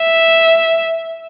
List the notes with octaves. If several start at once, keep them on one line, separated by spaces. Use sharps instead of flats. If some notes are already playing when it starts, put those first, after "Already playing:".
Already playing: E5